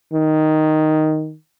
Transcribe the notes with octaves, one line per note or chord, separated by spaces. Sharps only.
D#3